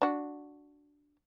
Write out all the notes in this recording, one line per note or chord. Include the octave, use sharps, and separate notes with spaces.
D4 F#4